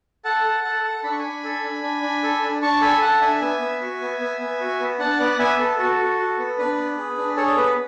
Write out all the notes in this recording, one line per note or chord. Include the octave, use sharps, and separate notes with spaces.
A4 F#5 A5
A4
A4 F#5 A5
A4
D4 B5
C#6
G#5 B5
D4
A4
D4
D4
D4
A4
D4
D4 A5 C#6
A4 G#5 B5
A4 F#5 A5
D4 E5 G#5
B3 E5 G#5
B3
F#4
B3
B3
B3
F#4
B3
D4 F#5 A5
B3 D5 F#5
B3 E5 G#5
B3 A4
F#4 A4
F#4
F#4
B3
D4 B4
B3
G#4
D4
G#4 A4 C#5
B3 B4